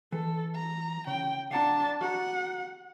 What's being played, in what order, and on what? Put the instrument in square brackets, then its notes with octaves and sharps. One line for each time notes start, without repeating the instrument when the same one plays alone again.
[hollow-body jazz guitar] E3 [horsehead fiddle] A4
[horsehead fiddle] A#5
[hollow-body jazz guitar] C#3 [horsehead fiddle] G5
[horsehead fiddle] D4 A5 [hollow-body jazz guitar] F5 F#5 A#5
[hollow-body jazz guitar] F#4 G4 A#5 [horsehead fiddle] F#5